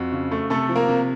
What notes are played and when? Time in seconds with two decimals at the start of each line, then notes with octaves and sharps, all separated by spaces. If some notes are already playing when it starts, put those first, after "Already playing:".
Already playing: F2 F#4
0.12 C#3
0.31 A3
0.50 C3 A3 A4
0.69 F3
0.76 A#3 A#4
0.89 C3